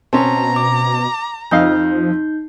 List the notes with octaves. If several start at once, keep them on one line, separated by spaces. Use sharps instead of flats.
B2 C4 C#4 A5 A#5
D6
F2 F3 D#4 D#5 F5 G6